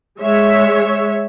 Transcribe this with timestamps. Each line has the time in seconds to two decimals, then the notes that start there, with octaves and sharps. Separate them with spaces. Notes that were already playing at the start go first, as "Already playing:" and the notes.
0.20 G#3 C#5 E5